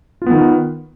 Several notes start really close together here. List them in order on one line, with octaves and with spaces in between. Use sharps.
F4 B3 D#3